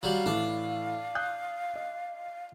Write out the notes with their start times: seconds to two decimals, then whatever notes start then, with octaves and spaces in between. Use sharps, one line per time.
0.03 F#3 G3 F5
0.26 A2 E3 D4
1.15 D#6 F#6 G6
1.76 D#5